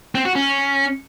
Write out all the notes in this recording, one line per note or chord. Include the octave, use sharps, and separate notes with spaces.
C4
F#4
C#4